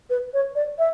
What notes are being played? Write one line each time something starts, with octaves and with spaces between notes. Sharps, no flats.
B4
C#5
D5
E5